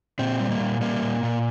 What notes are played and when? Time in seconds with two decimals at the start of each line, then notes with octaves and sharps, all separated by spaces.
0.19 A#2 C4
0.40 G3
0.51 A#3
0.60 A#2
0.81 G3 A#3
1.02 A#2
1.23 A#2